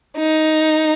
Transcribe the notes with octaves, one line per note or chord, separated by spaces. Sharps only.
D#4